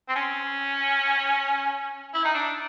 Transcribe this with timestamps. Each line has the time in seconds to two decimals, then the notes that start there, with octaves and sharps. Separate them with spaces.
0.09 C4
0.16 C#4
2.14 E4
2.25 D#4
2.35 D4